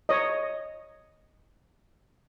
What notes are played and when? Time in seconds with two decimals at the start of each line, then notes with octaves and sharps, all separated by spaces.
0.09 C#5 D#5